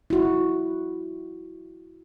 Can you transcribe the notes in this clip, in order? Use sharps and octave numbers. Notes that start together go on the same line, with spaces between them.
E4 F#4